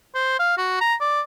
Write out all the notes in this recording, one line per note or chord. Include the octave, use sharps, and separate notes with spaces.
C5
F5
F#4
A#5
D5